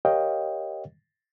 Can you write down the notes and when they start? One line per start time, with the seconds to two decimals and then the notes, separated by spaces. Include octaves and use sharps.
0.05 G4 A#4 C#5 D#5 F5 G5